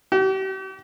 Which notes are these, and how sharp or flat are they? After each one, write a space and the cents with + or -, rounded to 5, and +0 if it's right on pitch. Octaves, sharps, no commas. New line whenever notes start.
G4 -40